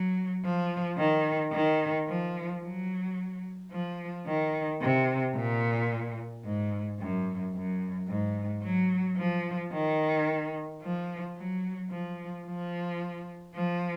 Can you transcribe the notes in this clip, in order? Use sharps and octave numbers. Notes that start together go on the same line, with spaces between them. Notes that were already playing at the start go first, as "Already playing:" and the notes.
Already playing: F#3
F3
D#3
D#3
F3
F#3
F3
D#3
C3
A#2
G#2
F#2
F#2
G#2
F#3
F3
D#3
F3
F#3
F3
F3
F3